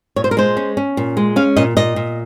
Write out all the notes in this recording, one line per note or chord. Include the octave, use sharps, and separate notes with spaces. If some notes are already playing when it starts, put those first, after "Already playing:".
A#2 C#5
C5
A#4
G#3 C5
C#4
C#4
A#2
G#3
C#4 F5
A#2 D#5
A#2 D#5
A#2